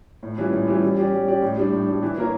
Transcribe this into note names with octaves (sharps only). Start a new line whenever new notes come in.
A2
E3 G3 C#4 F4
A2
E3 G3 C#4 F4
G3
C#4 G4 D5
G3
C#4 G4 D5
A2
G3 D4
A2
G3 D4
E3
A#3 E4 A#4 C#5